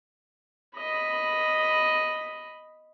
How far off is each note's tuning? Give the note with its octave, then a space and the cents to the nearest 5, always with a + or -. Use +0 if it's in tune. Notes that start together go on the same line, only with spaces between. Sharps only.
D#5 +0 B5 +0